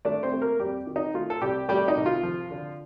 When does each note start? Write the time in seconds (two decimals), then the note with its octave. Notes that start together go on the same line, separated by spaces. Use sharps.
0.05 A3 D4 D5
0.23 C4 C5
0.33 A3
0.41 A#3 A#4
0.60 F2 G3 G4
0.87 D#3
0.96 D#4
1.14 A3 F4
1.30 A4
1.42 C2 G3 G4
1.69 G3 A3 G4
1.88 D#4
1.97 C2
2.06 F4
2.23 F3
2.51 D3